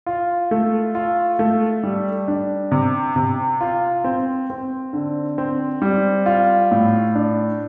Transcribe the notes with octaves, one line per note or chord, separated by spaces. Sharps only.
F4
A3
F4
A3
G3
D4
C3
C3
F4
C4
C4
D3
C4
G3
F4
A2
D4